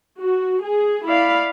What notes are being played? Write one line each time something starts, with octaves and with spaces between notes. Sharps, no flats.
F#4
G#4
E4 D5 F5 B5